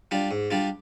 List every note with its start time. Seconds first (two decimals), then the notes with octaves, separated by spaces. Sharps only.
0.11 G3 D4 F4
0.31 G#2
0.50 G3 D4 F4